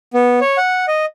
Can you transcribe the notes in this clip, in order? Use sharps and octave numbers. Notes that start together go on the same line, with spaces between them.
B3
C#5
F#5
D#5